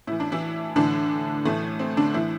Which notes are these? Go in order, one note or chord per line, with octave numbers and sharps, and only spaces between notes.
A2 E3 E4
D4
E3 E4
A2 D3 E3 D4
A2 E3 A3
C4
D3 D4
A2 E3 E4